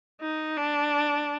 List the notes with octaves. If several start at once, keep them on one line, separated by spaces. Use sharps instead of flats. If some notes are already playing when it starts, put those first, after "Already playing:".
D#4
D4